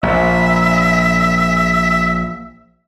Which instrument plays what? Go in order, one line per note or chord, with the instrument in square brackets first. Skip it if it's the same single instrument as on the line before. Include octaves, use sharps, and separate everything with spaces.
[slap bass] A#1 [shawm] E5